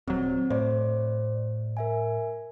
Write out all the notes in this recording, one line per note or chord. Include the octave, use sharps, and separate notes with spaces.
D#1 F#3 C4
A2 C5 D5
A#4 E5 G#5